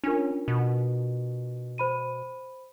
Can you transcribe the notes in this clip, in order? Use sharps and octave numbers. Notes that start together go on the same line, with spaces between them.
C#4 D4 F4 A#4
B2
C5 B5 D#7